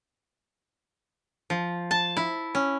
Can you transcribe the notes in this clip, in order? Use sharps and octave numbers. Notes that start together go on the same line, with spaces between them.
F3
A5
E4
C#4